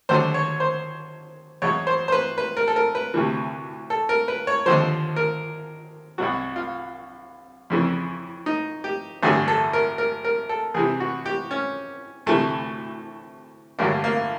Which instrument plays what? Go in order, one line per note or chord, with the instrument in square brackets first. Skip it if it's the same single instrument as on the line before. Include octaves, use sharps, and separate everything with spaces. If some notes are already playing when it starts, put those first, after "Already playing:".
[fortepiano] D#2 D3 F#3 C5
C#5
C5
E2 B2 F#3 C#5
C5
C5
B4
B4
A#4
A4
A#4
B4
D2 C3 E3
A4
A#4
B4
C#5
D#2 D3 F3 C5
A#4
C2 B2 F#3 F#4
F4
F2 C#3 E3
D#4
G4
A1 G2 D3 F#3 G#4
A4
A#4
A#4
A#4
A4
E2 C3 E3 G#4
F#4
G4
C#4
D2 C3 E3 A3
A1 G2 D3 F#3 A#3
A#3